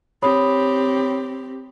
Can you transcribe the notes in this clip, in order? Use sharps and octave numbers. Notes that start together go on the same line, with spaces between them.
C4 G4 C#5 B5 D#6